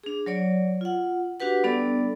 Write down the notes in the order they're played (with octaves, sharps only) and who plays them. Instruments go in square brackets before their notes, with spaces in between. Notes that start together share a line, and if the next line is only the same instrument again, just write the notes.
[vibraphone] D4 G#4
F#3 C#5 D5
F4 F#5
D4 F#4 G4 B4 F#5
G3 B3 D4 A4 D5